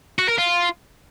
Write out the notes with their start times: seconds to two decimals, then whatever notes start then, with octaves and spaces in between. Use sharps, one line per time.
0.19 F#4
0.28 A#4
0.38 F4